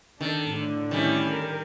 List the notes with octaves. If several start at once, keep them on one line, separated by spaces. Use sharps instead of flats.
D#3 D4 A4
A2 D3
D#3 G3 C#4 E4
A#4